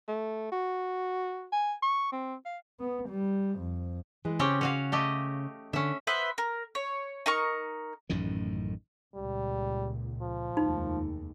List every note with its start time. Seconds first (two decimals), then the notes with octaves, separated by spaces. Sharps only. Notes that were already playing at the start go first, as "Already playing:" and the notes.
0.08 A3
0.52 F#4
1.52 G#5
1.82 C#6
2.12 C4
2.46 F5
2.80 B3
3.10 G3
3.59 F2
4.25 E3 G#3
4.39 C#3 C4 C#4 G4
4.61 C#4 F#4 F5
4.92 A3 G4 D#5
5.73 D3 C#4 E5
6.07 B3 B4 C5 E5
6.38 A#4
6.75 C#5
7.26 D#4 A#4 C#6
8.09 A1 F#2 A2 D#3
9.15 C#2 A#2 G3
10.22 F3
10.57 F1 D#2 G#3 D#4